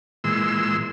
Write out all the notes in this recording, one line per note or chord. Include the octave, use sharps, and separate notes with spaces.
A#2 E3 G#3 C6 E6